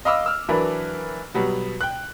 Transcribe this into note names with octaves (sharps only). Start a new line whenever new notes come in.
D#5 F5 B5 D6 E6
E6 F6
E3 F#3 D4 A#4 B4
B2 F#3 G3 B3
G5 F#6